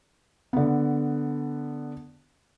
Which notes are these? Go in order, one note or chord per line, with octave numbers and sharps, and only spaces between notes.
D3 B3